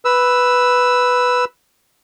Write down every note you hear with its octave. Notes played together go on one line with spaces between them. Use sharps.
B4 E6